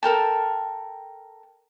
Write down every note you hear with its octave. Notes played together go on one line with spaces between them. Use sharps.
A4 A#4 G5 A5